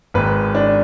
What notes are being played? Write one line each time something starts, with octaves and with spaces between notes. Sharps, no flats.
G#1 G#2 G#3 B4
D4